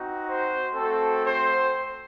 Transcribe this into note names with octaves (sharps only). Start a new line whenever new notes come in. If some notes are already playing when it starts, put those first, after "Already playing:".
Already playing: C4 D#4 F#4
C5
A3 C4 F#4 A4
C5